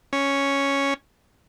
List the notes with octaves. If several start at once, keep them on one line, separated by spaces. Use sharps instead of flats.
C#4